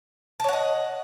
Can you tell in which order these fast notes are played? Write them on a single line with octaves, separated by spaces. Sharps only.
A5 C#5 F#5 D#5